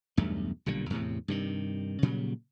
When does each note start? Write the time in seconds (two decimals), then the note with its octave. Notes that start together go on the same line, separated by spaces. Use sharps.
0.17 B1 E2 G2 A3
0.66 B1 A#2 D3 G3
0.90 E2 A2 C3
1.28 G2 C3 D#3
2.02 A#2 C#3 F#3 G3